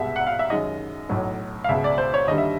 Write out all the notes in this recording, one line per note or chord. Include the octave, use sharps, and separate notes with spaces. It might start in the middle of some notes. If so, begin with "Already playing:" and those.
Already playing: C2 B2 G#3 E5
F#5
F5
E5
F#2 D#3 G#3 D#5
B1 A2 F#3 A3
F5
C#2 B2 G#3 E5
D5
C5
C#5
D#2 D3 G3 D#5
E5